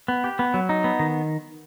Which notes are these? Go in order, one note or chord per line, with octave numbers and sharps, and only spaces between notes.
B3
G4
B3
F#3
D#4
B3
D#3